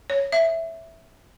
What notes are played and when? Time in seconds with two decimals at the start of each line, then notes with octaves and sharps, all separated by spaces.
0.10 C#5
0.32 E5